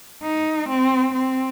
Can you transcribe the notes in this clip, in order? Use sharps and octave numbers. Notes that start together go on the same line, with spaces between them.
D#4
C4
C4